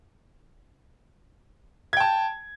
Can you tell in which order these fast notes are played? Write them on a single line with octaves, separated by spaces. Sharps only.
G#6 G5 A5